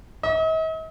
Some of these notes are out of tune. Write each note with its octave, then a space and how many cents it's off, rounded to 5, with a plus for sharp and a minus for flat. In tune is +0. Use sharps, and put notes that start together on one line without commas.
D#5 +45